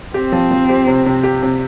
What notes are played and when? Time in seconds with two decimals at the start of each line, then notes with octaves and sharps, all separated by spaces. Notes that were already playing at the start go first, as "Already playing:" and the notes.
0.14 C4 G4
0.32 F3
0.51 F3
0.69 G4
0.87 C3
1.06 C3
1.23 G4
1.43 C3